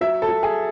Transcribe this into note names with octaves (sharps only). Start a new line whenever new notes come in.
F#3 E5
A4
F#3
G#4